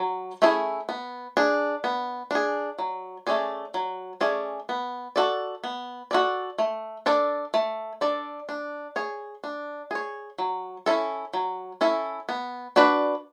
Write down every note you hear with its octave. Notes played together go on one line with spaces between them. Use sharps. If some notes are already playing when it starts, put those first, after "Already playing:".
Already playing: F#3
A3 C#4 E4 G#4
B3
D4 G#4
B3
D4 G#4
F#3
A3 C#4 G#4 D5
F#3
A3 C#4 G#4 D5
B3
F#4 A4 D5
B3
F#4 A4 D5
A3
D4 A4 D5
A3
D4 A4 D5
D4
G#4 C#5
D4
G#4 C#5
F#3
C#4 E4 A4
F#3
C#4 E4 A4
B3
D4 F#4 B4 D5